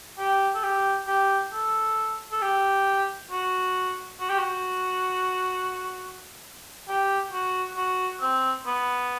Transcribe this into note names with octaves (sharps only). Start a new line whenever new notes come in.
G4
A4
G4
G4
A4
A4
G4
F#4
F#4
G4
F#4
G4
F#4
F#4
C4
B3